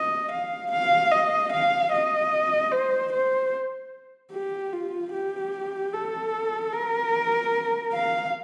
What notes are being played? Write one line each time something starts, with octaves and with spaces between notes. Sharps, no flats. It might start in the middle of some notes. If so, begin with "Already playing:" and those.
Already playing: D#5
F5
F5
D#5
F5
D#5
C5
C5
G4
F4
G4
A4
A#4
F5